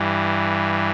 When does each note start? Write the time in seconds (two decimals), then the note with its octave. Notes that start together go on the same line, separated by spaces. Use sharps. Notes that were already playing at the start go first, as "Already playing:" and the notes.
Already playing: G2 E3